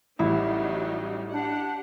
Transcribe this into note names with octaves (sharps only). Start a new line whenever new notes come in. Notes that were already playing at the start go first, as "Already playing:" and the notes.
A1 F#3 G3 D#4 E4
D4 G4 F#5